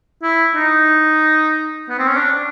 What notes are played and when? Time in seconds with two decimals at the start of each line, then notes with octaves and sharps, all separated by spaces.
0.23 E4
0.55 D#4
1.89 B3
1.99 C4
2.08 C#4
2.17 D4